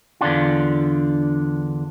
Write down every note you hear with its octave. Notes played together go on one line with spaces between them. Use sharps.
E2 D3 D4 F4